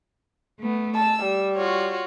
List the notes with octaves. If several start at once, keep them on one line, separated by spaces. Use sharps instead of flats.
A3 B3
A5 E6
G3
F4 F#4 C#5